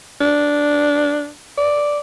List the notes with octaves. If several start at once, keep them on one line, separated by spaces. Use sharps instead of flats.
D4
D5